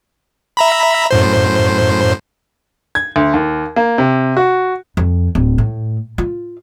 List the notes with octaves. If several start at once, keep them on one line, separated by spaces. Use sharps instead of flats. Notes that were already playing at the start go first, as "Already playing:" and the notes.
E5 A#5 B5
F#2 A2 C5
G#6
D2
D#2
A#3
C3
F#4
F2
D1
A2
F4